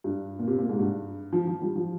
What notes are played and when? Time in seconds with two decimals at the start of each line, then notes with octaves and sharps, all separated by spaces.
0.04 G2
0.39 A#2
0.48 C3
0.59 A#2
0.69 G#2
0.79 G2
1.33 F3
1.47 F3
1.62 G3
1.76 F3